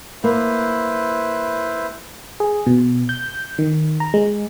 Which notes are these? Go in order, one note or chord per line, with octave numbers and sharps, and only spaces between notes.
A#3 E4 B4 C5
G#4
B2
G6
D#3
A#5
G#3